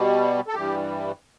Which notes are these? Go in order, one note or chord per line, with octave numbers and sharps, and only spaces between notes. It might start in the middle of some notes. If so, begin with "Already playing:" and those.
Already playing: B2 G3
A4
G2 E3 G3 G4